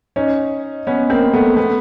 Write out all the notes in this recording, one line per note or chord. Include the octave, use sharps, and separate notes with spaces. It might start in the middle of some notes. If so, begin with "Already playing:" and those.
C#4 D#4
B3 C#4
A#3 C4
A3 B3
A3 B3